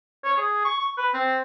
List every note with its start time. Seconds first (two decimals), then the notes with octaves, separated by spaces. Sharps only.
0.24 C#5
0.38 G#4
0.65 C#6
0.79 C#6
0.98 B4
1.14 C4